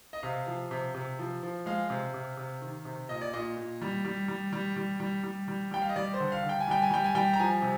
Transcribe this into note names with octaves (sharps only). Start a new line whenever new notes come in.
D#5
C3 F5
F3
C3
C3
F3
F3
G#3 F5
C3
C3
C3
D#3
C3
A#2 D#5
D5
A#2 D#5
A#2
G3
G3
G3
G3
G3
G3
G3
G3
G3 G5
F5
D#5
G3 D5
C5
D3
F5
D3
G5
G#5
G3 G5
G#5
G3 G5
G#5
G3 G5
A#5
F3 G#5
C3